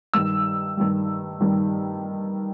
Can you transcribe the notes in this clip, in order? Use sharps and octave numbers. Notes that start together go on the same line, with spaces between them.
G2 D#3 G3 E6
G2 D#3 G3
G2 D#3 G3